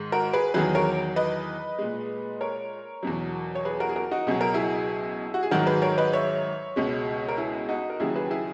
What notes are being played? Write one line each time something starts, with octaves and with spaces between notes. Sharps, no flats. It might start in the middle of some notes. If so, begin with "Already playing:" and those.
Already playing: G#2 D#3 G#3
F#4 A#4
G#4 B4
E2 D#3 F#3 G#4 B4
A#4 C#5
B4 D#5
A#2 G#3
A#4 C#5
E2 B2 F#3
C#5
G#4 B4
F#4 A#4
G#4
F#4 A#4
D#4 F#4
C#2 B2 F#3 G#4
A#4
E4 G#4
F#4
G#4
G#2 D#3 F#3 F#4 A#4
G#4 B4
A#4 C#5
B4 D#5
C#5 E5
C#2 B2 G#3
A#4
E4 G#4
D#4 F#4
A#4
D#2 C#3 F#3 E4 G#4
G#4 B4
E4 G#4